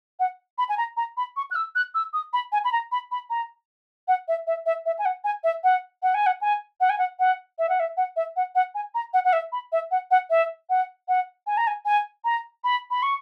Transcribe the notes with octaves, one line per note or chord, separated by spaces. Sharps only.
F#5
B5
G#5
A#5
A#5
B5
C#6
F#6
E6
F#6
E6
D#6
B5
G#5
B5
A#5
B5
B5
A#5
F#5
E5
E5
E5
E5
G#5
F#5
G#5
E5
F#5
F#5
G#5
F#5
G#5
F#5
G#5
F#5
F#5
E5
F#5
E5
F#5
E5
F#5
F#5
G#5
A#5
F#5
F#5
E5
B5
E5
F#5
F#5
E5
F#5
F#5
G#5
A#5
G#5
G#5
A#5
B5
B5
C#6